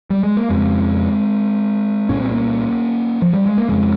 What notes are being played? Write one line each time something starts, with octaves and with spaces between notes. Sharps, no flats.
G3
G#3
A#3
F2 C#3 G#3 C4
C2 A#2 C#4
C4
A#3 C#4
F3
G3
G#3
A#3
F2 C#3 G#3 C4